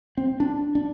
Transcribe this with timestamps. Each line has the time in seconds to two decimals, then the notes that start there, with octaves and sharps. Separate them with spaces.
0.17 C4
0.40 D4
0.75 D4